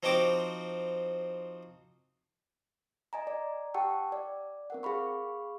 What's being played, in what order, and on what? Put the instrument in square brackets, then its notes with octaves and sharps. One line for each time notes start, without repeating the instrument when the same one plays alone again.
[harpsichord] F3 C4 D#4 F#4 G5 D6
[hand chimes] D#5 G#5 A#5
D5
G4 F#5 G5 A5 C#6 E6
D5
C4 A#4 F#5
G#4 F5 B5 C#6